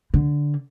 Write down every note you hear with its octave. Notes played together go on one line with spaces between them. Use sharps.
D3